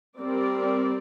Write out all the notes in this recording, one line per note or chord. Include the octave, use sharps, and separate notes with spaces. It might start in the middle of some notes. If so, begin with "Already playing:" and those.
G3 C4 A#4 D5